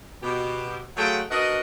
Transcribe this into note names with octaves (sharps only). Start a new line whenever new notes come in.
B2 G4
F#3 A3 F4 G#4 F#5 G5
D4 F#4 A#4 B4 D#5